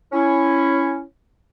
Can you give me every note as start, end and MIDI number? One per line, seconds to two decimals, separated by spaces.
0.12 1.01 61
0.12 1.01 64